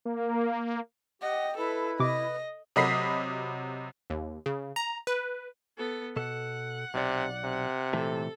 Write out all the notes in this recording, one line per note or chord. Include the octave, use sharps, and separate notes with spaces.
A#3
G4 D#5 F#5
E4 A4 B4
C3 D#5 D6
C3 F#3 D#5 B5 B6 C7
D#2
C#3
A#5
B4
B3 A4
B2 A4 F#5
B1 C3 D5
C3
A#2 E3 A3 A4